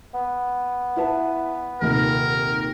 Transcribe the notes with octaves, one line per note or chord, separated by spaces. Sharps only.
B3
E4 B4 A5
D#1 D#2 C3 A#4